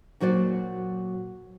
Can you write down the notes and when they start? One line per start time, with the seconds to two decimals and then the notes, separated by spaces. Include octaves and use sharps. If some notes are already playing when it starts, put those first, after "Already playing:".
0.20 A#2 F#3 F#4 C5 D5